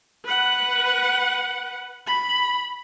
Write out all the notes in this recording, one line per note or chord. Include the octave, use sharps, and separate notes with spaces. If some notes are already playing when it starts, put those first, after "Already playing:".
B4 F#5
B5